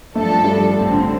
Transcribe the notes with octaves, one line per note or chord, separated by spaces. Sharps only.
G2 F3 A3 D4 A4
G3
A1 A2 F3 C4
D3